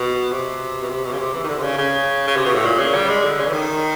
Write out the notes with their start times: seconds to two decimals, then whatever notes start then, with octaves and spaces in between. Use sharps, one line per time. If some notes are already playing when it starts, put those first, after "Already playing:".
Already playing: B2
0.31 C3
0.82 B2
0.90 C3
1.05 B2
1.13 C#3
1.18 C3
1.34 E3
1.43 D#3
1.48 D3
1.58 C3
1.62 C#3
1.78 C#3
2.27 C#3
2.37 C3
2.45 B2
2.55 A2
2.65 A#2
2.79 C#3
2.95 G3
3.09 G#3
3.24 D3
3.39 C#3
3.47 E3
3.53 D#3